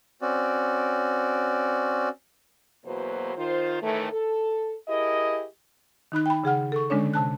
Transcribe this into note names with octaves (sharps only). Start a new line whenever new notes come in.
C4 C#4 F#4 D5
E2 B2 F#3 A#3 B4 C5
D#3 F4 C5
A2 D#3 E3 A3
A4
E4 G4 G#4 A#4 D#5
D#3 D#4 B5 F#6
G5 B5
C#3 G#4 F#5 F6
A4 C#6
D3 G#3 C#4 D4 C#5
C3 A5 F#6